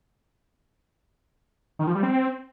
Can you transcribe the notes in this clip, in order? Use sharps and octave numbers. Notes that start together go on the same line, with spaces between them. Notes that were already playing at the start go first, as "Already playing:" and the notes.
D#3
F3
G3
C4